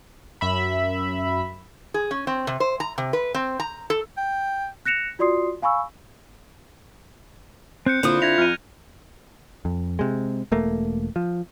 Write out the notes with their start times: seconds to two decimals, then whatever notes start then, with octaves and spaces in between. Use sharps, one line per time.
0.41 F#2 E5 B5
1.94 G#4
2.11 C#4
2.27 C4
2.47 C3
2.60 C5
2.80 A#5
2.98 C3
3.13 B4
3.35 C4
3.60 A#5
3.90 A4
4.17 G5
4.86 F#6 A#6 C#7 E7 F7
5.19 F4 F#4 D5 C6 D#6 C7
5.62 F5 G#5 B5 C#6 E6
7.86 C4 F#6 G6 C#7
8.03 A#2 D3 C4 E4 F4 D#6
8.22 D3 E5 G#6 A#6 F7
8.38 F2 F6 D#7
9.65 F2
9.99 C3 G#3
10.52 E1 A3 A#3
11.16 F3